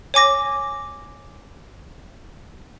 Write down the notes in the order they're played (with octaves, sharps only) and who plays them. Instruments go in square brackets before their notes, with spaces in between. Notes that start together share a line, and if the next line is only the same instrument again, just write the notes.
[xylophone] C#5 G#5 D6 A#6